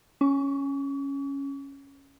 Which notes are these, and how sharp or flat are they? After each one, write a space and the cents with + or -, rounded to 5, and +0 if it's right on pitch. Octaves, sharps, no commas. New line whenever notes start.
C#4 +0 C#6 +45